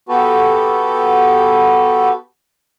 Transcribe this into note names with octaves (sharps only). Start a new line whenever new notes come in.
B3 F#4 G4 A4 B4